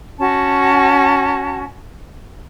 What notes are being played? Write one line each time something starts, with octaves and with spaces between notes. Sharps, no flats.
C#4 F#4 A5